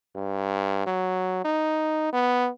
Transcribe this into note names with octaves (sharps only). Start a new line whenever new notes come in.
G2
F#3
D#4
B3